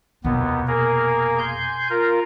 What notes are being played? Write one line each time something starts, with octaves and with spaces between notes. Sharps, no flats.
F1 D#2 B2 B3
A#3 G#4 A#4
G#5 C6 G6
F4 A#4